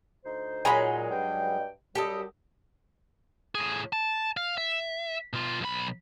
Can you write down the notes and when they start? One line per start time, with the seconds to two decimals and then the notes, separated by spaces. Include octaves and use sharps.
0.25 D2 D#4 C5
0.65 A#2 F#3 G#3 D#4 G#5 A#5 B5
1.11 G2 G5
1.95 F#2 G3 G4 A4 D#5
3.55 A2 G#4
3.93 A5
4.37 F5
4.58 E5
5.33 B2 F4
5.61 B1 B5